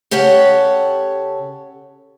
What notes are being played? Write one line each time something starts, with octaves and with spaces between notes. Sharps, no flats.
C#3 G4 A4 C#5 F#5